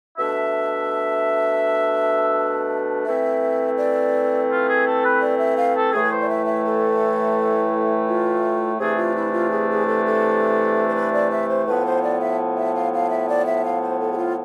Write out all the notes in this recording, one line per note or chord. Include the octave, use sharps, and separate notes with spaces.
B2 A3 D4 E5
E3 A3 C4 E5
D5
F4
G#4
A4
B4
D5
E5
F5
A4
A2 E3 A3 G#4
B4
C5
D5
E5
E5
A4
F4
C3 E3 A3 D4 G#4
F4
E4
F4
G#4
G#4
A4
A4
C5
B4
D5
E5
C5
A2 F3 B3 B4
C5
D5
E5
E5
F5
F5
E5
D5
E5
F5
C5
A4
G#4
F4